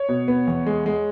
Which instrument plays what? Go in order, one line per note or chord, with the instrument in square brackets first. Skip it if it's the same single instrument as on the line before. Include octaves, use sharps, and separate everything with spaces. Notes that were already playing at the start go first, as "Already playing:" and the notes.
Already playing: [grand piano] C#5
B2
B3
E2
G#3
G#3